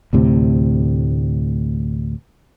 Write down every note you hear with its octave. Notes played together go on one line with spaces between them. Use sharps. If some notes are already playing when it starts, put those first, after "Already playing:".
D2 A2 C3